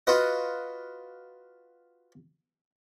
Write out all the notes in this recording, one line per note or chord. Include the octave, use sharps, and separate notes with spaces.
F4 F#4 B4 D#5